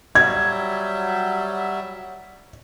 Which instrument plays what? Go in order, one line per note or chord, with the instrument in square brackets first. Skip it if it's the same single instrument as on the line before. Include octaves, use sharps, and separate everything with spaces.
[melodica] F#3 G3 E5 [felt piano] G#6